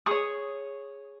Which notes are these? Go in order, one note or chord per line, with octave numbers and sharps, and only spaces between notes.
G#4 C#5 C#6 D#6